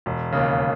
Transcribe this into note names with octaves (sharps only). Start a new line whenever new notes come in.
E1
D#2 C#3